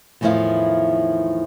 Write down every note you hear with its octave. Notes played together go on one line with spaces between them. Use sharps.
E2 A2 D#3 F3 E4 F5